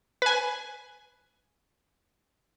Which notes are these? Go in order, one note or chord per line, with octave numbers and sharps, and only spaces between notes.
B4 G#5